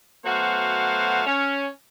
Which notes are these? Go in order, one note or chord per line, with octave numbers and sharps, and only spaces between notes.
F#3 A3 B3 F#4 C5 F5
C#4